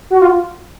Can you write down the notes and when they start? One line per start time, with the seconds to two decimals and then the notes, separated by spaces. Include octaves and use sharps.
0.11 F#4
0.22 F4